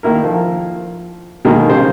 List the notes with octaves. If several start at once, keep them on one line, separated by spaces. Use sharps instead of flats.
D#3 A#3 E4 A#4
F3
B2 D3 D#3 G#3 A#3
C#3 G3 C5